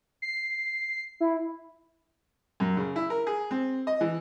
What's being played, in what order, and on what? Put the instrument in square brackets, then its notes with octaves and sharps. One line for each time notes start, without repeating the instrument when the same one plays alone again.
[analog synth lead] C7
E4
[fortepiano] F#2
C#3
E4
A#4
G#4
C4
D#5
E3